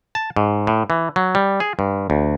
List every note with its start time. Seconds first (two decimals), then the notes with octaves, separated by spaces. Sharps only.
0.15 A5
0.36 G#2
0.67 A2
0.90 E3
1.16 F#3
1.35 G3
1.60 G#4
1.79 G2
2.10 D2